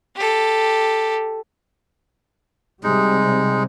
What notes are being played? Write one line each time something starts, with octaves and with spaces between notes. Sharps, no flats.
G4 A4
C3 G3 G#3 D#4